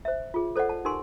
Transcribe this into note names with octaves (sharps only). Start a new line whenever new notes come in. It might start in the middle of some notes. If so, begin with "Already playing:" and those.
C5 E5
F4 G#4
A4 C5 D5 D#5 F#5
A5
D#4 G4 A#4 G#5 C6